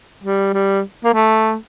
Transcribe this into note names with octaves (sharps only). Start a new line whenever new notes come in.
G3
G3
A#3
A3